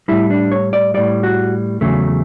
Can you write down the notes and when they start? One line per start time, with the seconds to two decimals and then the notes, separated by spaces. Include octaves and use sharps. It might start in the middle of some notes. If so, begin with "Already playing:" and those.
0.08 A2 G3 E4
0.30 D4
0.52 C#5
0.73 D5
0.94 A2 G3 D5
1.23 F#4
1.81 E2 C#3 F#3 A3